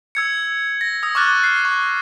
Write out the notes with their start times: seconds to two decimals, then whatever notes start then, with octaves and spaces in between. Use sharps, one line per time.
0.15 E6 G#6 C#7
0.81 A#6
1.03 D#6 E6
1.15 C#6 D6 F6 F#6 A6
1.44 C7
1.65 C#6